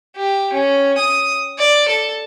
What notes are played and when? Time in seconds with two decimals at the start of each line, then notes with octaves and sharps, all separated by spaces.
0.16 G4
0.53 C#4
0.98 D#6
1.59 D5
1.88 A4